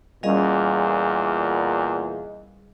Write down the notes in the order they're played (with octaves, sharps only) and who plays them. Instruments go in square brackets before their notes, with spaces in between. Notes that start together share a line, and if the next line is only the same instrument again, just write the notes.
[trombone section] E2 A#2 [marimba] G3 C#4 [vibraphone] G#4 D#5 F5